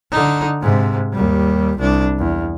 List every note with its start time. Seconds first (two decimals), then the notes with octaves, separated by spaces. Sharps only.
0.12 D3 D#4
0.62 G#2 C3
1.12 D#2 G3
1.79 C2 D4
2.18 E2